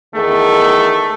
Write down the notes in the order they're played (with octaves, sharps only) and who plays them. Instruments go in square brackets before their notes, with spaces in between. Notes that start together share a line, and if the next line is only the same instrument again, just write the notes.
[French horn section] E2 D#3 G#4 [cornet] A3